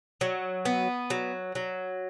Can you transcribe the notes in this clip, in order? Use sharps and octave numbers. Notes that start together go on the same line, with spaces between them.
F#3
B3
F#3
F#3